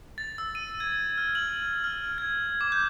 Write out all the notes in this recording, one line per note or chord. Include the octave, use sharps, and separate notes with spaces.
A6
E6
D#7
G#6
F6
F#7
F6
G#6
D6
G6